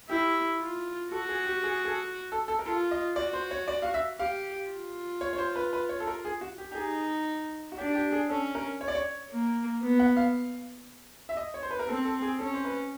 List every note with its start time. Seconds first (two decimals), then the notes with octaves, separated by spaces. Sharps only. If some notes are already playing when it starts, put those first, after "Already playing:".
0.09 E4 G4
0.60 F4
1.12 F#4 A4
1.29 G#4
1.46 G4
1.63 G#4
1.85 G#4
1.88 A4
2.32 A4
2.48 A4
2.59 A#4
2.65 F4 A4
2.91 D#5
3.16 F#4 D5
3.33 C5
3.51 C#5
3.68 D5
3.82 F5
3.94 E5
4.19 G4 F5
4.71 F4
5.21 C#5
5.33 C#5
5.38 C5
5.56 B4
5.73 B4
5.89 C#5
6.00 A4
6.07 A#4
6.25 G#4
6.41 F#4
6.58 G4
6.72 G4
6.75 D#4 G#4
7.72 F#4
7.78 D4 G4
7.95 G4
8.12 G#4
8.29 C#4 A4
8.55 A#4
8.81 C#5
8.88 D5
8.95 C#5
9.32 A#3
9.83 B3
9.99 F#5
10.17 F5
11.29 E5
11.37 D#5
11.54 C#5
11.63 C5
11.71 B4
11.79 A#4
11.87 C4 A4
12.05 A4
12.22 G#4
12.38 C#4 A4
12.54 C5
12.65 B4